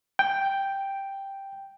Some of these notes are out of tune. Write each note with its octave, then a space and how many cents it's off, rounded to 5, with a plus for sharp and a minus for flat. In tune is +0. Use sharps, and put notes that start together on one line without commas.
G5 +0